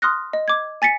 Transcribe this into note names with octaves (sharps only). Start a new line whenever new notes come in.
C6 D#6 F6 F#6 A#6
D#5
D6 G#6
G#5 A6 B6 C#7